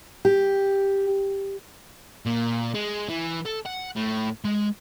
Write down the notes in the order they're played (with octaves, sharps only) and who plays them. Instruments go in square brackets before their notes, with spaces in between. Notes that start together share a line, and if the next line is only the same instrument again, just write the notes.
[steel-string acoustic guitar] G4
[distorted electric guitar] A#2
G#3
E3
A4
F#5
A2
G#3